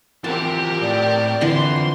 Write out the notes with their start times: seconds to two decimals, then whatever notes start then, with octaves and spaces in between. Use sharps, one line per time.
0.24 E3 F3 C4 G4 A#4 A5
0.81 A2 D5
1.41 D3 E3 F3 C4 C6